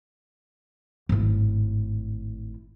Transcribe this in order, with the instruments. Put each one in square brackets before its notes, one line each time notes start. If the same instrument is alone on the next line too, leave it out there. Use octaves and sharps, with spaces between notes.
[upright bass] G#1 A2